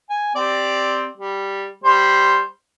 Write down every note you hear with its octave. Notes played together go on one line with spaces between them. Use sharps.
G#5
C4 G4 D5
G3
G3 C5